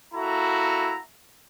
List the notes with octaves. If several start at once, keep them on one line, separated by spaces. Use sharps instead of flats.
A#3 E4 F#4 A4 A#5